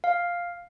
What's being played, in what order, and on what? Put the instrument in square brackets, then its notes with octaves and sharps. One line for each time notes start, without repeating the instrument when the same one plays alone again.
[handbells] F5